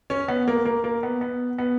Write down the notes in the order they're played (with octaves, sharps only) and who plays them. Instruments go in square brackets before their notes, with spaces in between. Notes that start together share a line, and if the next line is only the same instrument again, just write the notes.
[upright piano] C#4
B3
A#3
A#3
A#3
B3
B3
B3